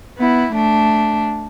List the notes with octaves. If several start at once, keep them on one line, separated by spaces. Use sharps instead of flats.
B3 E4
A3 D4